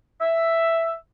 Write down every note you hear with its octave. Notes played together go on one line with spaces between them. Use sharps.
E5